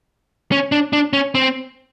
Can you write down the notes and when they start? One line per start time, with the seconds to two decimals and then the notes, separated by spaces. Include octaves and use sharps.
0.52 C#4
0.72 D4
0.93 D4
1.13 C#4
1.35 C4